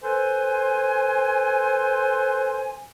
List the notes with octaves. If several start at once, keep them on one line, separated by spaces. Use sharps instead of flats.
A4 B4 C5 G#5